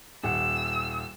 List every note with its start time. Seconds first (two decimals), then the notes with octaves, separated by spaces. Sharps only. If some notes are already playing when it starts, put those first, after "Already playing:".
0.23 D#1 F#5 E6